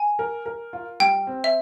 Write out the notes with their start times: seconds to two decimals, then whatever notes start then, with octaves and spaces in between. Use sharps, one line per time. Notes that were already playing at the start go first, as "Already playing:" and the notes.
Already playing: G#5
0.19 A#4
0.46 A#4
0.73 F4
1.00 G3 G5
1.27 C4
1.44 E5